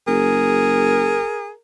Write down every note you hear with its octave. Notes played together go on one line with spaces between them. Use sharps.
F#1 G#4 A#4